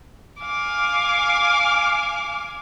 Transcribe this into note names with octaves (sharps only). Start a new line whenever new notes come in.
F5 G#5 D6